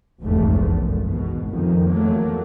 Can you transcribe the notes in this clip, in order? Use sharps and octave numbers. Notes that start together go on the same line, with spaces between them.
F1 B1 E2 G#2 A3
F#2
G#1 B2
F2 D#3
E2 F#3 A3 A#3